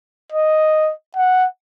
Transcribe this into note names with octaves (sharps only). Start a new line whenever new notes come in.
D#5
F#5